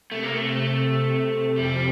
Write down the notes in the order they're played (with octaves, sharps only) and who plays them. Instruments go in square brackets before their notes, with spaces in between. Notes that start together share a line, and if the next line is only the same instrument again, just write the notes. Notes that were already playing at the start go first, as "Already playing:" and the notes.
[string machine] C3 [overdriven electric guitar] A3
[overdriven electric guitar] A#3
A3
[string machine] C3
C3
[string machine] F2 F3 [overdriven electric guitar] G3